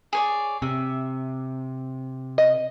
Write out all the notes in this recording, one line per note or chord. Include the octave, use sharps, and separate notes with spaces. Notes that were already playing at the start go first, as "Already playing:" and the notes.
G#4 C#5 D5
C3 E5
D#5